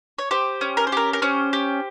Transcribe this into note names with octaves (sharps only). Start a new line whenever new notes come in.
C#5
G4 C5
C#4
A#4
C5
G4 A#4
A#4
C#4 C5
G4